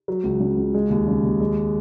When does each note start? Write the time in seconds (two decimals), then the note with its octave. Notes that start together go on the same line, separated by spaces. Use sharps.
0.08 F#3
0.24 C#2
0.40 C#3
0.57 C#2
0.74 G#3
0.90 D#2
1.08 C#3
1.23 D#2
1.40 G#3